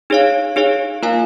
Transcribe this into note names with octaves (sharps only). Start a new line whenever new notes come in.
D#4 G#4 C#5 F5
D#4 G#4 C#5 F5
A#3 F4 A#4 F5 G#5